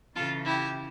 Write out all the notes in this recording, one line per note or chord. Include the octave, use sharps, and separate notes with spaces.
C#3 E3 F4 A4
E4 G4